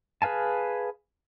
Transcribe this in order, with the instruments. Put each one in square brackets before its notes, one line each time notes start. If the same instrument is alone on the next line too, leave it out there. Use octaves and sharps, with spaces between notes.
[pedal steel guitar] G#4 B4 F5 G#5 A5